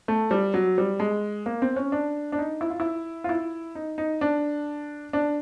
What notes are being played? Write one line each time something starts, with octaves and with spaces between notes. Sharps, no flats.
A3
G3
F#3
G3
G#3
A#3
C4
C#4
D4
D4
D#4
E4
F4
E4
F4
E4
D#4
D#4
D4
D4